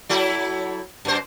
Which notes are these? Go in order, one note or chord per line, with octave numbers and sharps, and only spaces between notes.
F#3 E4 A4
F#2 C5